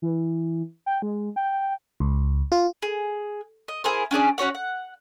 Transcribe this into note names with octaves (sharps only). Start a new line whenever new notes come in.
E3
G5
G#3
G5
C#2
F4
G#4
D#5
E4 G#4 A#4 C5
C#4 D4 G#4 D5
C#4 F#4 C#5 F#5
F#5